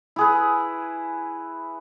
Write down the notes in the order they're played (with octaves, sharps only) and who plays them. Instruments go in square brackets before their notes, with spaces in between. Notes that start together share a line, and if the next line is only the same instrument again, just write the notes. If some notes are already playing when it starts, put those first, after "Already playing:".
[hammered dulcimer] E4 G#4 B4